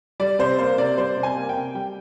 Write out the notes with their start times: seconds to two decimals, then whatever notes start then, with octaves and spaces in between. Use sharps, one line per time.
0.20 G3 D5
0.39 C3 C5
0.59 A#3 C5
0.78 C3 D5
0.97 G3 C5
1.17 C3
1.23 G#5
1.36 A#3
1.49 G5
1.56 C3
1.75 G3 G5